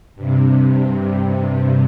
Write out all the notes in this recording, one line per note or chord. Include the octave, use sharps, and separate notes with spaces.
G2 C3